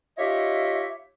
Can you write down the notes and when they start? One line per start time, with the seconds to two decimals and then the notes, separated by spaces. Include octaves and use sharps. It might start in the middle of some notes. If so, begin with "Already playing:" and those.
0.18 D#4 F4 G4 C#5 D#5 E5